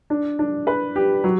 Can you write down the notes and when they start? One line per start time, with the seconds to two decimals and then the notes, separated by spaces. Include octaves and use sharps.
0.10 D4
0.39 D4
0.67 B4
0.96 G4
1.24 F#3